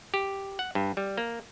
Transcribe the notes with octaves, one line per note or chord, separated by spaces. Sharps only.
G4
F#5
G2
G3
A#3